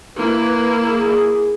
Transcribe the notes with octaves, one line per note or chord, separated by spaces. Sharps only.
A#3 E4 B4
G#4